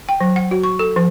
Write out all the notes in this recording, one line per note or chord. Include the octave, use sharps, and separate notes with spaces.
G5
F#3
F#5
F#4
C#6
A4
F3